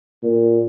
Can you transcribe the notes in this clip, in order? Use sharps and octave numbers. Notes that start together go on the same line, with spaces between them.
A#2